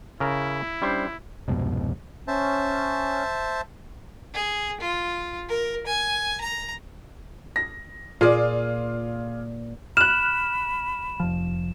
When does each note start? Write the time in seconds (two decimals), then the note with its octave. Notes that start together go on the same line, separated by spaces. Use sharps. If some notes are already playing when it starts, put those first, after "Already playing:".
0.20 C#3 E4 A#4
0.82 G3 C#4 D4 C5
1.48 C2 F2 G#2 B2
2.28 C#4 C5 E5 A5
4.34 G#4
4.81 F4
5.49 A#4
5.86 G#5
6.41 A#5
7.56 A#6
8.21 A#2 F4 G#4 D5
9.97 B5 F6 F#6 E7
11.20 F1 F3